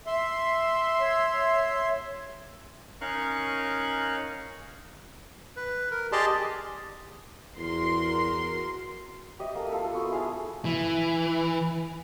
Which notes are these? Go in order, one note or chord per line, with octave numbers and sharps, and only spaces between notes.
E5 C6
C#5
C#4 D#4 A#4 F5 C#6 F#6
B4
A#4
G4 G#4 D5 D#5 A5 C6
E2 F#4 A#4 C6
G4 D#5 E5
A#3 A4
F4 A4
B3 F#4 C6
E4 G#4 F5 A5
E3